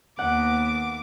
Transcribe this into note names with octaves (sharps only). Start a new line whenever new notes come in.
D#2 B3 F#5 D6